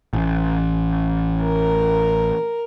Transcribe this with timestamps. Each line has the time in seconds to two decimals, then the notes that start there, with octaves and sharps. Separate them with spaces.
0.13 A1
1.41 A#4